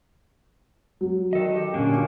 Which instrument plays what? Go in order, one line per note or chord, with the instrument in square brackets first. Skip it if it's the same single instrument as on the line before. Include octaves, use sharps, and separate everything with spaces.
[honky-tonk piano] F#3
[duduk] D#3 [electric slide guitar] A4 D#5
[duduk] G4
[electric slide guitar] A#2 D3 A#3 [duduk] C#4